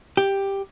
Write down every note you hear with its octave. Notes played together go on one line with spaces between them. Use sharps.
G4